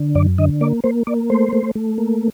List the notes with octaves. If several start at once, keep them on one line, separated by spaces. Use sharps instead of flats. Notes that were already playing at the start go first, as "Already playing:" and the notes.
Already playing: D3
F#2 D5
D3 D#5
A#3 D5
A#3 C5
A#3 D5
A3 C5
A3
A3
A#3